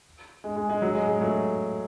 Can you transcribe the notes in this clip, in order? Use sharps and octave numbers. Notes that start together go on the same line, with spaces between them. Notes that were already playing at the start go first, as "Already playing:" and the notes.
G#3
G#3
G#3
F#3
G#3
G#3
F#3 A3